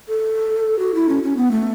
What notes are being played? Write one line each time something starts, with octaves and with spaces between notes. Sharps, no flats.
A4
F#4
E4
C#4
C#4
B3
A3